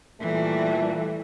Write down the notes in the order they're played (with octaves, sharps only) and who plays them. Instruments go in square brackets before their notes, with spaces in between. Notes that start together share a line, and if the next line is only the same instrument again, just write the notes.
[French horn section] A#2 A3 [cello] E3 G3